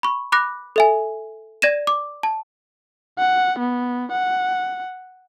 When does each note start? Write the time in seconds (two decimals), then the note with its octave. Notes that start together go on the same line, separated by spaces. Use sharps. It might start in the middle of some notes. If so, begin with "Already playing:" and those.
0.03 B5 C#6
0.32 B5 D6 F#6 A#6
0.76 A4 E5 G#5
1.62 D5 G#6 A#6 D#7 E7
1.87 D6
2.23 A5
3.19 F#5
3.59 B3
4.12 F#5